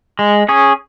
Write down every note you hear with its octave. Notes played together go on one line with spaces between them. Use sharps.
G#3
C#4 G#4 C#5